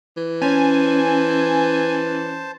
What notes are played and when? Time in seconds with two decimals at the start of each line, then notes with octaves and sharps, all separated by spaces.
0.17 E3
0.42 C#4 C5 G#5 A5